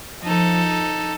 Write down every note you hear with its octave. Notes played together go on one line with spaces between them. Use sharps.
F3 D#4 A4